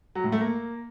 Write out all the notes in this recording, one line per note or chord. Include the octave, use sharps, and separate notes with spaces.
F#3
A2
A3
A#3